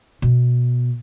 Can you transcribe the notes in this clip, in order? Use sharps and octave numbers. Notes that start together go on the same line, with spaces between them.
B2